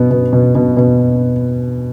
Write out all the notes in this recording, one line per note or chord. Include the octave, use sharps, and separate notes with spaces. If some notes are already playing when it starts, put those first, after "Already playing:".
Already playing: B2 B3
B2
B2
B2
B2